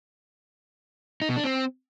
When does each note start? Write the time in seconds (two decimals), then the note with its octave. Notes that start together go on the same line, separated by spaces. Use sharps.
1.22 D#4
1.29 B2
1.36 D4
1.44 C4